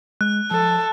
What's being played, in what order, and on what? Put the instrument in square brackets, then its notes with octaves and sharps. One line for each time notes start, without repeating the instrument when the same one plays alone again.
[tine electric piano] G#3 [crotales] F#6
[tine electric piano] F3 [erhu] A4